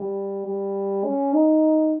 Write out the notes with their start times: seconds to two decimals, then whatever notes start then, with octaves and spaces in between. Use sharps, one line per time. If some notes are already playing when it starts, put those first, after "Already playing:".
Already playing: G3
0.45 G3
1.04 C#4
1.33 D#4